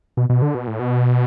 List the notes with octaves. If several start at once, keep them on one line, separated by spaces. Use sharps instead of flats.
B2
B2
D3
B2
A2
B2